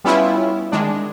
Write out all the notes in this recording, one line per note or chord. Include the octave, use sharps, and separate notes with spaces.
G3 B3 C#4 E4 F4
D#3 G#3 D4